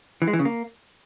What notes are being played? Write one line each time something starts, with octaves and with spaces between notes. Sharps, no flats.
E3
G#3
E3
C#3
A#3